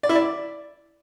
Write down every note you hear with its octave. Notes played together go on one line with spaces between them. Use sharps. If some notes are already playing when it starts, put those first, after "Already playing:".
D5
E4
D5